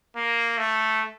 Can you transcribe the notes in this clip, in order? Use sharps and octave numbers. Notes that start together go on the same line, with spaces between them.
A#3
A3